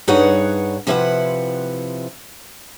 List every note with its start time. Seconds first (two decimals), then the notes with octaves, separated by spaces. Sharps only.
0.08 G2 D#4 G#4 B4 C#5 F#5
0.87 C3 F3 E4 B4 C5 F#5